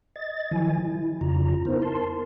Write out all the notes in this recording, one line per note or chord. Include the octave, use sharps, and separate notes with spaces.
D#5 A6
D#3 F3 F#3 E4 G#5
E4
F2 C#3 F4 A#5
B3 D#4 E4 A#4 C5
A#4 A5 C6